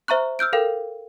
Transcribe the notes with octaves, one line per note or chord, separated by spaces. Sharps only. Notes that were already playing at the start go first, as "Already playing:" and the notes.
C5 E5 A#5 C#6 F#6
E6 F6 G6 D7
A4 A#4 F5 G5